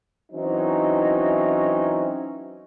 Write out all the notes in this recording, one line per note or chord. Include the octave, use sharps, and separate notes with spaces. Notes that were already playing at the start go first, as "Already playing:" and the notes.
E3 F#3 C4 C#4 D#4